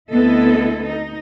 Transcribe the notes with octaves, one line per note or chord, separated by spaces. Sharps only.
D2 B3 C4 E4 A4 D#5
D#4